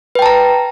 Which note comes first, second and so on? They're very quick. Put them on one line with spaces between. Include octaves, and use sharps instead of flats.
B4 G5 A5 A#5